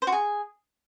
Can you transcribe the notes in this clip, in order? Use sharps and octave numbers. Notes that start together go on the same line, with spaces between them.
C5
F#4
G#4